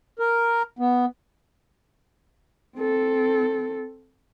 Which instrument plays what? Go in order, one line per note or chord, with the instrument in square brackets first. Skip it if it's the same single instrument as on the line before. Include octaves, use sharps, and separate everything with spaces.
[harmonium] A#4
B3
[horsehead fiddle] C4 A4